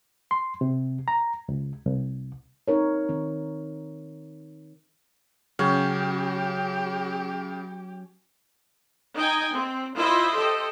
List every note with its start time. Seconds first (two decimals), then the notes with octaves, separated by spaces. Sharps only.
0.31 C6
0.61 C3
1.08 A#5
1.49 C#2
1.86 C2
2.68 C4 D#4 A#4 C#5
3.09 D#3 C4
5.59 C#3 F#3 C#4 G4
9.15 D#4 D#5 G5 G#5
9.54 C4
9.95 E4 F4 C5 D#5 E5 C6
10.35 G4 A4 C5 D#5